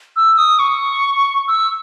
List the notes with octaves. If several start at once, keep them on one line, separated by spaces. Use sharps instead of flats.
E6
D#6
C#6
E6